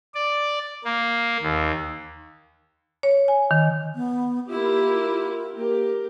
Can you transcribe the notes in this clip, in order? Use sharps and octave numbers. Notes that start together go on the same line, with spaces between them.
D5
A#3
D#2
C#5
G#5
D#3
B3
A#3 E4 F4 G4
A#3 G4 A#4